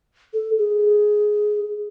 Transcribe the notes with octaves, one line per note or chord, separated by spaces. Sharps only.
A4
G#4